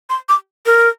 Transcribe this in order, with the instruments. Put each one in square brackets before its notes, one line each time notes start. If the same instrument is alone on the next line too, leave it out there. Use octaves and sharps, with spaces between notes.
[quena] C6
D6
A#4